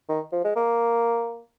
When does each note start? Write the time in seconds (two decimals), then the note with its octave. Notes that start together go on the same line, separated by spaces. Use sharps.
0.09 D#3
0.33 F3
0.45 G#3
0.56 A#3